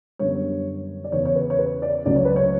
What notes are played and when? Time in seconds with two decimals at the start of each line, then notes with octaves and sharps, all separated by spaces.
0.19 F#2 D3 G3 B3 C#5
1.04 D5
1.12 E2 C#3 E3 B3 C#5
1.25 C#5
1.35 B4
1.50 C#5
1.59 B4
1.82 D5
2.05 C#2 C#3 F#3 A3 D5
2.16 C#5
2.25 B4
2.36 C#5